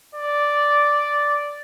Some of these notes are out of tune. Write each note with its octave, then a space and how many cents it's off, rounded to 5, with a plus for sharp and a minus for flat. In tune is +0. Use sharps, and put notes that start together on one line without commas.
D5 -5